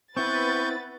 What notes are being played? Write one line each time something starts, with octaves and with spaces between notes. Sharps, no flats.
B3 C4 E4 B4 F#5 C#6 G6 A6